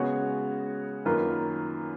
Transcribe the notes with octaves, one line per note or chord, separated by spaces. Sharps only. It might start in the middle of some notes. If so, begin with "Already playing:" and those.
Already playing: C#3 G#3 B3 F#4 C#5
F#2 D#3 A#3 F4 B4